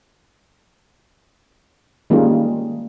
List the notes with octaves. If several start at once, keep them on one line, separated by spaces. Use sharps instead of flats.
D#3 G3 G#3 A#3 C#4 F4